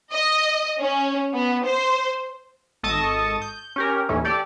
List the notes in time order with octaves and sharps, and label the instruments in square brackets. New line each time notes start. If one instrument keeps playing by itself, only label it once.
[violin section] D#5
C#4
B3
C5
[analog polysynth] G#1 A4 D#5 A5 C#6 D#6
G6
C#4 G4 A#4
D#2 A2 E3 C#4
G4 A4 D5